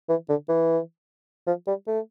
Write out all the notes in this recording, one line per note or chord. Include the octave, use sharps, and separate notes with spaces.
E3
D3
E3
F3
G3
A3